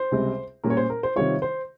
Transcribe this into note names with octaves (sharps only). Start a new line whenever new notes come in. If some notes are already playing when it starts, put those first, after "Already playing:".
Already playing: C5
C#2 C3 G3 C4
A#2 G3 C#4 A#4
C#5
C5
A#4
C5
C3 D#3 G3 C4 F4 C#5
C5